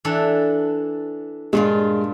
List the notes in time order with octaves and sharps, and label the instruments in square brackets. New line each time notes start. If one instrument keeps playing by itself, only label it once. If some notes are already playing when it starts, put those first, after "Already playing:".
[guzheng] E3 D4 A4
[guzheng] G2 A#2 F4 [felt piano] G#3